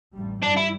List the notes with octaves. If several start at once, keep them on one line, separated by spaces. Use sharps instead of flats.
A1 G2 G3
G2 E3 G3 D4
E4